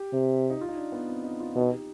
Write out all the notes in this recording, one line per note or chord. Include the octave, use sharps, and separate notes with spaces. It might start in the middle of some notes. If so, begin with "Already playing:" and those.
Already playing: G4
C3
D#4
F4
D#4
D4
B3
C4
D#4
F4
B2 D#4
G4